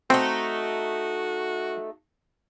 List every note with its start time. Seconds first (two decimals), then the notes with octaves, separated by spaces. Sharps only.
0.10 A3 C4 D#4 F#4